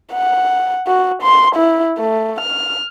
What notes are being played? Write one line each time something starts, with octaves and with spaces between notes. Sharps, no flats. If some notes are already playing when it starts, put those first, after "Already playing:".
F#5
F#4
C6
E4
A3
F6